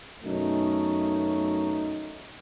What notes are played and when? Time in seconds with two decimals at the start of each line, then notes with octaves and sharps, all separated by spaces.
0.24 F#2 B2 A3 C#4 D#4